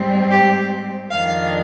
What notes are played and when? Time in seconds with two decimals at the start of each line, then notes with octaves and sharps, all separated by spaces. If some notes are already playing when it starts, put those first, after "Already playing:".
Already playing: G#2 G3 C4
0.30 G4
1.11 F2 D#3 G#3 D4 F5